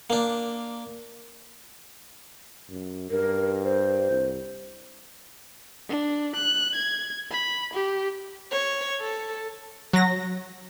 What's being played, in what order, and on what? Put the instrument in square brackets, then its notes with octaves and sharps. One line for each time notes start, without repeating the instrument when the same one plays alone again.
[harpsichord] A#3 D4
[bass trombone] F#2
[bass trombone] G2 [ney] A#4
[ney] C5
[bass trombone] C2
[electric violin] D4
F#6
G#6
B5
G4
[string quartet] C#5
A4
[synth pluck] F#3 A#6